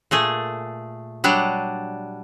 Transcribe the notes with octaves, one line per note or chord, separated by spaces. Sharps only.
A#2 A3 G#4
F#3 G3 D4